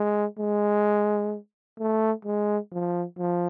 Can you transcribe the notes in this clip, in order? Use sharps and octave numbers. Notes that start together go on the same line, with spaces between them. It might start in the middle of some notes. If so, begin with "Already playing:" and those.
Already playing: G#3
G#3
A3
G#3
F3
F3